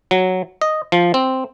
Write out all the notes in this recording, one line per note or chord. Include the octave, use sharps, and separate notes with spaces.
F#3
D#5
F3
C4